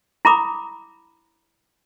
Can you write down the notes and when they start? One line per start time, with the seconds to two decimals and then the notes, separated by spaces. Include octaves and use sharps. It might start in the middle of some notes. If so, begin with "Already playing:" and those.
0.25 E4 A#5 B5 D6 D#6